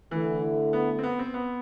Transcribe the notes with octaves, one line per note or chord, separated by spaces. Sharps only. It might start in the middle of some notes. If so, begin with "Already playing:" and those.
D3 E3 A3 E4 A4
B3
C4
B3
C4
B3